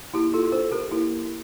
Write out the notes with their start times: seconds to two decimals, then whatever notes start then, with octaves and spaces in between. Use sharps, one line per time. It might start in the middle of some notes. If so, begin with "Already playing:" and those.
0.14 A#3 E4 G4
0.34 F4 A4
0.52 D4 A4 C5
0.72 G4 A#4
0.91 A#3 E4 G4